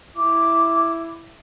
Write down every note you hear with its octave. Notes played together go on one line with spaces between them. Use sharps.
E4 D6